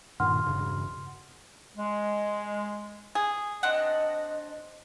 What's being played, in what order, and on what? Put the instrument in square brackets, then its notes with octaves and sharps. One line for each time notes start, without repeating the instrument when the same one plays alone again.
[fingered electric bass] G2 A#2 D#3 [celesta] F#5 C6 F6
[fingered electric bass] E1 G2 C#3
[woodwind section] G#3
[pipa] G#4
[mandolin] C4 D4 F#5 [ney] D#5